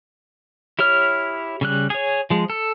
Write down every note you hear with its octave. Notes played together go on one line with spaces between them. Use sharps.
E4 G4 C#5 F6
C#3 G3 F#6
G#4 C#5
F3 G#3
A4